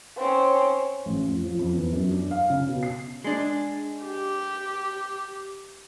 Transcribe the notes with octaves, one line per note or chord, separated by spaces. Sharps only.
C4 C#4
A1
F2
F3
F2
E2
F#2
D4
F5
C#3
B2
C7
G#3 D4
G4